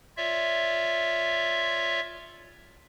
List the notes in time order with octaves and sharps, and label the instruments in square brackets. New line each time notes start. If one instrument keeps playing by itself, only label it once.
[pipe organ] F4 C#5 D5 E5